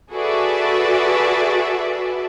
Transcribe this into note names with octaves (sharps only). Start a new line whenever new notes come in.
F#4 G#4 A4 B4 D5 E5